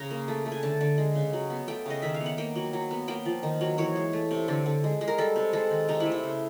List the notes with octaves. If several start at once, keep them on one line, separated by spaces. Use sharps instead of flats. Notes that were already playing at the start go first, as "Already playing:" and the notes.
Already playing: C#3 A#5
A#3
A3
A3
G#5
D3 A5
D3
G#3
C#3
F#3
B3
A3 G5
C#3 D#5
D#3 E5
F5
B3
F#5
A#3 G5
F#3
F#3
B3
A#3 G5
F3
D#3
F#3
E3 C#5
G#3
A3
C3
D3
D3
G#3
G#3
A#4
G3 A4
C3
G#3 A4
D#3
C3 D#4
E4
A3
E4
C#3